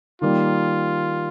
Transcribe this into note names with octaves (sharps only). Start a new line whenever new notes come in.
D#3 G3 A#3 F4